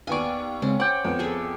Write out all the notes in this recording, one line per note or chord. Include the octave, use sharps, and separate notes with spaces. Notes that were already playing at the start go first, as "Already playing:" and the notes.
D#2 B3 D5 G#5 C#6
C#3 G#3 C4 C#4
C5 F#5 G5 D6
F2 B3
G#4 A4 E5